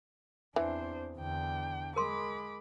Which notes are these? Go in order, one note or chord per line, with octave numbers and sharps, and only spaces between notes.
E2 E3 C4 D4 C5
E2 D3 D4 G5
G#3 A#4 B5 C6 D6